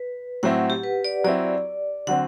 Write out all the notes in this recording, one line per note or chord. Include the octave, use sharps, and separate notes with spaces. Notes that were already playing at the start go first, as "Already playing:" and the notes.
Already playing: B4
A2 F#3 C4 E4 F#5
G4
B4
D5
F#3 C4 E4 D5
D3 F#3 C4 F#5